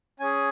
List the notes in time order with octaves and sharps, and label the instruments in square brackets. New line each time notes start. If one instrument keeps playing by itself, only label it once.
[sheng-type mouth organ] C#4 G#4 G#5